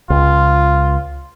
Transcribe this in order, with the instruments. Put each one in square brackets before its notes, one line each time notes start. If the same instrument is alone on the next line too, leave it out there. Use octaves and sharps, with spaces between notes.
[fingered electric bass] C#2 [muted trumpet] F4